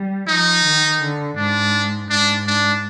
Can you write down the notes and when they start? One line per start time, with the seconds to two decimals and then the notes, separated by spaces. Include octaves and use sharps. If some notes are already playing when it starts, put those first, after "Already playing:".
Already playing: G3
0.27 F3 D#4
0.64 D#3
1.01 D3
1.36 G#2 D4
2.10 G#2 D4
2.47 D4